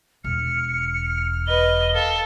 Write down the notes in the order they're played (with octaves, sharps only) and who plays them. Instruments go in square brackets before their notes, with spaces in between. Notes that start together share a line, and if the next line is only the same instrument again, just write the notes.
[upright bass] E1 [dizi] F6 [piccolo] C#7
[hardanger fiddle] B4 D#5 [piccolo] G7
[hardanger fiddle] A4 [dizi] F5